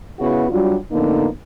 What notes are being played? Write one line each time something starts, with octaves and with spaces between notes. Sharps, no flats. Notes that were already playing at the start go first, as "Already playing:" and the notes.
C#3 B3 E4 F#4
F#3 G3 D4 F4 F#4
F2 A2 D3 A#3 B3 D#4